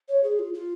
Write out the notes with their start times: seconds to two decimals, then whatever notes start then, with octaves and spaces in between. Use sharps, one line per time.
0.09 C#5
0.24 G#4
0.39 F4
0.54 F4